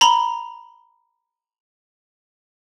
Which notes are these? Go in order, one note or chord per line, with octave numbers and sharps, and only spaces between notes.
A#5 B5 G7